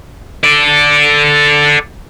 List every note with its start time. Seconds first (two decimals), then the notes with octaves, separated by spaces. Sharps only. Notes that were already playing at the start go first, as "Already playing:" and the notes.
0.43 A4 D5